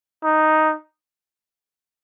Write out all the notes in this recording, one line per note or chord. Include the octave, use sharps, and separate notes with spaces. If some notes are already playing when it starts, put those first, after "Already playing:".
D#4